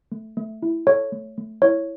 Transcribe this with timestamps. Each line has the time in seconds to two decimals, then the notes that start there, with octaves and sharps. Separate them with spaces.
0.12 A3
0.37 A3
0.63 E4
0.87 A4 C#5
1.12 A3
1.38 A3
1.62 E4 C#5